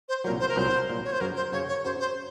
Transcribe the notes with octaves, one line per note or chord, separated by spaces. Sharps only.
C5
C2 A#2 F#3 A#4
C5
A#4
C2 A#2 F#3 C5
C2 A#2 F#3
C#5
C5
F#2 C#3 F#3 A#4
C5
F#2 C#3 F#3 C#5
C#5
F#2 C#3 F#3 C5
C5